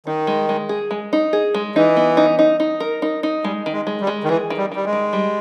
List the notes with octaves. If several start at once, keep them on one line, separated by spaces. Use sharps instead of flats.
D#3 D#4
G#3
G#3
G#4
G#3
D#4
G#4
G#3
E3 D#4
B3
D#4
D#4
D#4
A#4
D#4
D#4
G3 G#3
D#3
G#3
G#3
G3
G#3
D#3
E3 G#4
D#3
G3
D#3 G3
G#3
D#3
G3